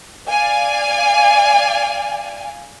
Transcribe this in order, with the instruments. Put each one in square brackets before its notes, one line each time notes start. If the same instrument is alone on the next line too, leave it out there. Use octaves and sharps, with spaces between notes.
[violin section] D5 F5 G#5